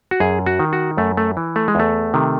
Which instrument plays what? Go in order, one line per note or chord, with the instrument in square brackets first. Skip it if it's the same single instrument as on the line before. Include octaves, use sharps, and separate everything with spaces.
[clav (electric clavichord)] F#4
F#2 G#4
F#4
D#3
F#4
F#2 A3
A3
E3
A3
G#3
E2 A3
C3 D#3